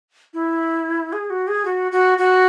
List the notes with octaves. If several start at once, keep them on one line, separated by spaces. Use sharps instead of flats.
E4
G#4
F#4
G#4
F#4
F#4
F#4